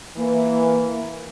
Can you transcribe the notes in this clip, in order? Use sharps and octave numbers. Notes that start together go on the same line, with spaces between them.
E3 A#3